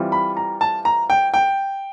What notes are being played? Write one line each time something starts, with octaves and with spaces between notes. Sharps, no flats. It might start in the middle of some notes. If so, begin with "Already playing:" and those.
Already playing: E3 G3 C4 F4
B5
A#5
A5
A#5
G5
G5